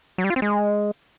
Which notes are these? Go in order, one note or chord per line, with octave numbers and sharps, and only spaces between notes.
F#3
G3
F4
C4
G#3